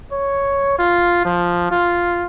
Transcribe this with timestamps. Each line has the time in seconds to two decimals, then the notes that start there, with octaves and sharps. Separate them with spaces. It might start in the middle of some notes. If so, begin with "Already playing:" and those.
0.12 C#5
0.79 F4
1.25 F3
1.71 F4